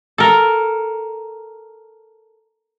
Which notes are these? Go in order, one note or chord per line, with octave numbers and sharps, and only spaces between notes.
A4 A#4